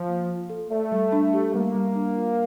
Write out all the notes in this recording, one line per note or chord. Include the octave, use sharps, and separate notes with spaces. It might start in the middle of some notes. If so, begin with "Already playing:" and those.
Already playing: F3
A#3
F4
A4
A3 D5
G3
D4
G4
G3 A#3
G3
D4
F4